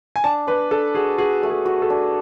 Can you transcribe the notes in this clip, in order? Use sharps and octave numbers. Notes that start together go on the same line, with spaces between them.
G#5
D4 A5
D4 B4
D4 A4
F#4 G#4
F#4 G#4
A3
G#4
F#4
A4
D4